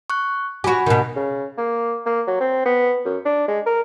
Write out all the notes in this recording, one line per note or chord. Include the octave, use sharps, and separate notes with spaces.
C#6 F#6
F#4 G4 G#5 B5
B2 D#3
C#3
A#3
A#3
F#3
C4
B3
F#2
D4
G#3
A#4